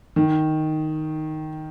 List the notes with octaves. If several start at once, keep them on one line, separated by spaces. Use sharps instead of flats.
D#3